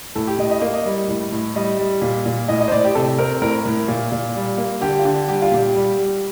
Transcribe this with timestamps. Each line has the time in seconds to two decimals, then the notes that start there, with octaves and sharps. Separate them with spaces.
0.15 A2 A4
0.27 G4
0.39 A2 D#5
0.51 D#5
0.62 A#3
0.74 D#5
0.85 G3
1.08 A2
1.32 A2
1.55 G3 D#5
1.79 G3
2.02 A#2
2.26 A#2
2.48 A2 D#5
2.61 D#5
2.68 C5
2.72 A2 D5
2.84 G4
2.95 C3 A4
3.18 C4 A#4
3.42 A2 A#4
3.66 A2
3.88 A#2
4.12 A#2
4.36 G3
4.58 A#3
4.81 D3 G4
4.99 F4
5.05 D3 G4
5.28 G3 G4
5.42 F4
5.52 A#2 G4
5.75 G3
5.98 G3